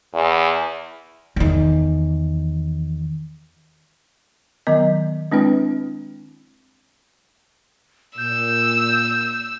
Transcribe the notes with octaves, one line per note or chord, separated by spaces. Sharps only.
E2
E2 D#3
D#3 F#3 B3 D#5
G#3 C4 D4 E4 B4 G5
A#2 E6 G6